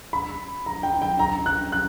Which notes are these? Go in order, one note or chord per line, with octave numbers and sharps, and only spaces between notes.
B5
A#5
G5
G5
A#5
F#6
F#6